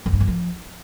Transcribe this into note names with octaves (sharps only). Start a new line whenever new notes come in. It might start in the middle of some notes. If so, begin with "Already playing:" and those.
F#2
G2
F#2
F3